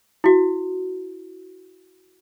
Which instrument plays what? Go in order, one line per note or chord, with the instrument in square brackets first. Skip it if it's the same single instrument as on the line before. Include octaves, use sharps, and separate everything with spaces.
[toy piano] E4 F#4